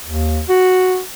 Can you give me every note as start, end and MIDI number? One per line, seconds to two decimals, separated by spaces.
0.05 0.41 39
0.49 1.01 66